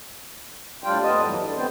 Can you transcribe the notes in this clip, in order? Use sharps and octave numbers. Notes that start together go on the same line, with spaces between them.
A2 G3 D4 F4 G5
F2 B3 D#5 A5
G#2 E3 F#3 G3
D3
B3 C4 C5